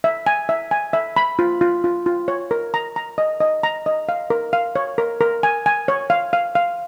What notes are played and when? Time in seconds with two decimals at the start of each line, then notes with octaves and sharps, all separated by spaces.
0.04 E5
0.26 G#5
0.49 E5
0.71 G#5
0.93 E5
1.17 B5
1.39 F4
1.61 F4
1.84 F4
2.06 F4
2.28 C#5
2.51 A#4
2.74 A#5
2.96 A#5
3.18 D#5
3.40 D#5
3.63 A#5
3.86 D#5
4.09 F5
4.30 A#4
4.53 F5
4.76 C#5
4.98 A#4
5.21 A#4
5.43 G#5
5.66 G#5
5.88 C#5
6.10 F5
6.33 F5
6.55 F5